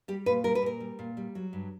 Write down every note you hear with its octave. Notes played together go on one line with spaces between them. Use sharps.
G3 G4
A#2 B4
G3 A#4
B4
A#2 A#4
G3
A#2
G3
F#3
G2